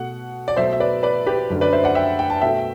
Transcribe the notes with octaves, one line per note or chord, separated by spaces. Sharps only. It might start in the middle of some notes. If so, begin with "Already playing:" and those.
Already playing: B2 A3 F#5
D5
B2 F#3 A3 C5 E5
E5
B4 D5
B4 D5
G4 B4
F#2 D3 A3
B4 D5
C5 E5
D5 F#5
E5 G5
G5
A5
B2 A3 E5 G5